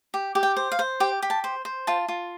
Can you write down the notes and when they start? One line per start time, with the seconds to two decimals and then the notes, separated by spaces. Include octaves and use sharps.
0.14 G4
0.35 G4
0.43 G5
0.56 C5
0.72 F5
0.79 C5
1.00 G4 G5
1.22 G4
1.30 A5
1.44 C5
1.65 C5
1.87 F4 A5
2.08 F4